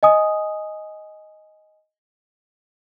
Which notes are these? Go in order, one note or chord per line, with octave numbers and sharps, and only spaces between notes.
D#5 G#5 D#6